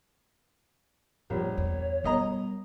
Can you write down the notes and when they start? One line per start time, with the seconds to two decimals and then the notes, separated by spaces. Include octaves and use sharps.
1.30 D1 A#1 G3 C#5
1.58 E2
2.04 B2 G3 D#5 A#5